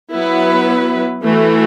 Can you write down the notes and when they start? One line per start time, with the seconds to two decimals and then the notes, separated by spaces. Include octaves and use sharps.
0.12 F#3 B3 E4 B4
1.22 E3 A3 F#4